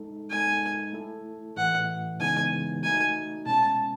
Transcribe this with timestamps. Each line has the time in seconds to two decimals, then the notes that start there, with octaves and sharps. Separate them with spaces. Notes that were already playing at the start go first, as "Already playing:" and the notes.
Already playing: G#3 D#4 A4
0.30 G#3 D#4 A4 G#5
0.93 A3 E4 A4
1.56 A2 E3 A3 F#5
2.20 C#3 E3 G#3 B3 D#4 G#5
2.83 A3 D#4 F#4 G#5
3.46 B2 G#3 C#4 A5